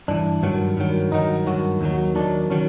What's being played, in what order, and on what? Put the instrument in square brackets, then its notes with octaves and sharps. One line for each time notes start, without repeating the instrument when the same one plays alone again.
[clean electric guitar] G2 E3 D4
G2 D#3 F#3
G2 D#3 F#3
G2 D#3 F#3 D#4
G2 D#3 F#3 F#4
D#2 D#3 F#3
D#2 D#3 F#3 D4
D#3 F#3 C#4